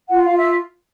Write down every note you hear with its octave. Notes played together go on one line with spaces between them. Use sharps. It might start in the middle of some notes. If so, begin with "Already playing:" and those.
F4 F#5
F5
F4
E5